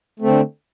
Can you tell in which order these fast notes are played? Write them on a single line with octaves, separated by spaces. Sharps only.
A3 C4 D3